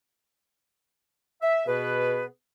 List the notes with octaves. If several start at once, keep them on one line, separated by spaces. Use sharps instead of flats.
E5
B2 B3 G#4 B4